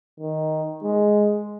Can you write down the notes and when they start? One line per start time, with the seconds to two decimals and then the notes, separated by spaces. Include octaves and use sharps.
0.20 D#3
0.83 G#3